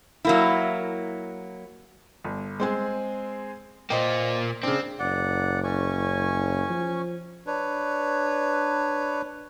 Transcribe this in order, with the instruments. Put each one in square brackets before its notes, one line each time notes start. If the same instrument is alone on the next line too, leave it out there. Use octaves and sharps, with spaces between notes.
[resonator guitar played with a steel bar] F#3 A#3 E4
[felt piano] G1
G#3 C4 G#4
[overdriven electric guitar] A#2 A#3 [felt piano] C5 D#5 G5
[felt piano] C#3 D4 [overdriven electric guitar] C4
[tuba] F#1 [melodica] D5 F#5
[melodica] C#4 G#5 C#6
[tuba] F3
[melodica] D4 B4 C#5